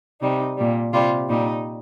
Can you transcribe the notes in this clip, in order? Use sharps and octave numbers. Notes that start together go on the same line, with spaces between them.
C3 G3 D#4
A#2 G3
C3 G3 F4
A#2 G3 D#4